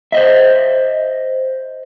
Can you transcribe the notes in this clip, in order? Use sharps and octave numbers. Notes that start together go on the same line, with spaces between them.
C5 D#5 E5